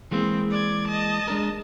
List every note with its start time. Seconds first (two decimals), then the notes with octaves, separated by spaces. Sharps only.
0.11 E3 G#3 A#3 C4
0.50 D5 G#6
0.88 D#5 A5
1.28 G#3 D4 A#4